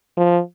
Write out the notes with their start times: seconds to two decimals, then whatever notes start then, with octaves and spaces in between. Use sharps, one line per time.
0.17 F3